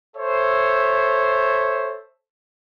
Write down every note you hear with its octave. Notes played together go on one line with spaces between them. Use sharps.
A4 C5 C#5 E5